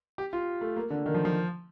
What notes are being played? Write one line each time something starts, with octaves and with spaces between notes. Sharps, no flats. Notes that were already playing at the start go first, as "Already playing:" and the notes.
G4
F4
A3
A#3
D3
D#3
F3
F3